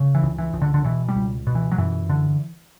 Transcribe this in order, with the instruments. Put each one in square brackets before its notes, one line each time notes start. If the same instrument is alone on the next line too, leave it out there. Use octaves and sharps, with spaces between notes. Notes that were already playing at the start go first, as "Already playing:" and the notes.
Already playing: [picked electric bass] C#3
E3
C#2
E3
C#2
D3
D3
B2 E3
G3
C#2
B2
E3
F#3
F#2 E3
D3